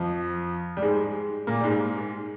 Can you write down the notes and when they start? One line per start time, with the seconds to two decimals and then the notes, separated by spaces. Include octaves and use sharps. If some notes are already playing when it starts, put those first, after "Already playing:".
Already playing: F2 F3
0.77 G3
0.82 G#2 G#3
1.47 A#2 A#3
1.61 G3
1.64 G#2 G#3